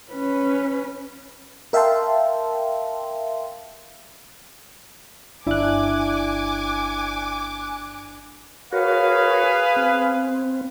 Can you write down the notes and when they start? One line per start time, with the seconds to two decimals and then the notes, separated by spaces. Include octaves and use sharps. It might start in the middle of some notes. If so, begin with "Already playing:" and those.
0.12 C#4 B4
1.73 A#4 E5 F5 G5 A5 C6
5.47 G1 D4 E4 G#5 D6 F#6
8.72 F#4 G#4 A#4 B4 C#5 F5
9.76 C4